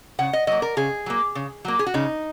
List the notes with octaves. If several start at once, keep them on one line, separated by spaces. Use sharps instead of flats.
C#3 F#5
D#5
F#3 A#3 D#5
A#4
C#3 G#4
F#3 A#3
C#3
F#3 A#3
G#4
F#4
C#3 D#4